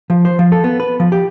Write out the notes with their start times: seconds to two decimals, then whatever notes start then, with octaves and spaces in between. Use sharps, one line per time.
0.10 F3
0.25 C5
0.39 F3
0.52 A4
0.64 B3
0.80 B4
1.00 F3
1.12 G4